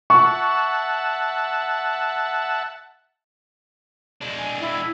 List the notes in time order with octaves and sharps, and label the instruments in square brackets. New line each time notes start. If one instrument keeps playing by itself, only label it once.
[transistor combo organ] E5 F#5 A5 [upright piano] C#6
[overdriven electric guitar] G#3 D4
[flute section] G#5
E4